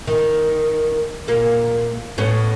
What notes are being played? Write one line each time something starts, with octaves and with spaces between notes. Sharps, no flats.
D#3
A#2 A#3
A2 B3 C#4